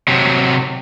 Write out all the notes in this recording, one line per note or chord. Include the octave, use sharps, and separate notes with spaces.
C3 F#3